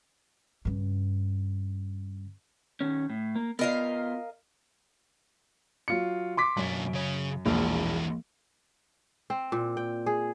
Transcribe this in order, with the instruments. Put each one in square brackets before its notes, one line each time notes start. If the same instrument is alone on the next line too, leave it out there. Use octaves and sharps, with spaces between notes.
[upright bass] G2 C#3
[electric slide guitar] D#3 C#4
A2
A#3
[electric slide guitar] B3 F4 [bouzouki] A#4 D#5 F5
[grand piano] F#3 F4 C#7
C6 D6 B6
[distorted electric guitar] B1 D4 [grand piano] F#2
[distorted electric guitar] C#3 C#5
[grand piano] E1 A#1 [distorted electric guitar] E3 A#3
[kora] C4
A#2
G5
G#4